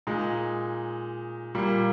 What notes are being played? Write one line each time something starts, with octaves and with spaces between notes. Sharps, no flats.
A#2 G#3 D#4
A#2 G3 A#3